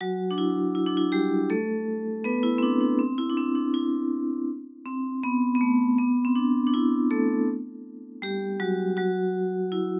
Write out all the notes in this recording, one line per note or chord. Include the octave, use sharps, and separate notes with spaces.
F#3 F#4
D4
E4
E4
D4
E4
G3 G4
A3 A4
B3 B4
E4
C4
D4
D4
C4
E4
D4
C4
D4
E4
C4
B3
B3
A3
B3
C4
D4
D4
E4
A3 A4
G3 G4
F#3 F#4
F#3 F#4
E4